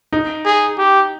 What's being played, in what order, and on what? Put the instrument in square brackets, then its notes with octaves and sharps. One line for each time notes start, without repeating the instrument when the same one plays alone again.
[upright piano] D#4
[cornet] G#4
G4